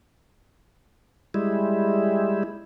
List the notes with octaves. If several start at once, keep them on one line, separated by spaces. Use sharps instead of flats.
G3 G#3 E4